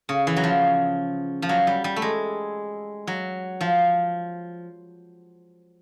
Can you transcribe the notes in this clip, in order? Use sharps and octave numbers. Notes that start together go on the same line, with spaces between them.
C#3
E3
F#3
F3
F3
F#3
G3
G3
A3
G#3
F#3
F3